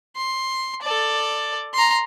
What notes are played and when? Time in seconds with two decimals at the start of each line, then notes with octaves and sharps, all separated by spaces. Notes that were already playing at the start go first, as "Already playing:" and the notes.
0.16 C6
0.82 A4 D5
1.74 A#5 C6